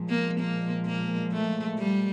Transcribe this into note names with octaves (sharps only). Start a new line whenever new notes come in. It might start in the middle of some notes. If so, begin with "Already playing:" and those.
Already playing: A#2 F3 G#3
A#3
A#3
A#3
A3
G3